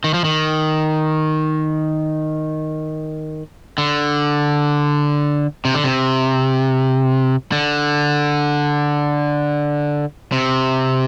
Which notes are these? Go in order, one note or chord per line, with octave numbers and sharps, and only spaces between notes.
D#3
F3
D#3
D3
C3
D3
C3
D3
C3